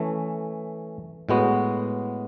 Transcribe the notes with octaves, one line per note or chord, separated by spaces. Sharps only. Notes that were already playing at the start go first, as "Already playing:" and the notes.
Already playing: E3 A3 C#4
A2 G#3 B3 F#4